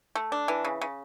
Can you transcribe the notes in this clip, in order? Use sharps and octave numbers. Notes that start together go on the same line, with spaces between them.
A3
D4
E3
C#3
C#3